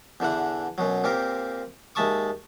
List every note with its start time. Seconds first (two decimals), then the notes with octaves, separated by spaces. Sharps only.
0.20 E2 D3 E3 F#5
0.78 F#2 B2 F#3
1.04 A#2 C4 G4 A#4
1.95 D#2 G#3 E5 A5 C#6 D#6